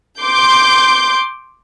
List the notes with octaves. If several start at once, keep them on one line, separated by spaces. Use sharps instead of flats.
C6 D6 G6